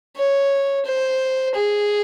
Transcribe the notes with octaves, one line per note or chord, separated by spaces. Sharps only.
C#5
C5
G#4